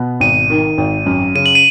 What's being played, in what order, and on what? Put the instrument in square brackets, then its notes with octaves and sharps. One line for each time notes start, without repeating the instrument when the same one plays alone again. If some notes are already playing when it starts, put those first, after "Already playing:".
Already playing: [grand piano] B2 B3
[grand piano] G#1 [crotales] D#7
[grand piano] D#3
G#1
F#2
[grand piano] C#3 [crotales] D#7
[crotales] F#7
D#7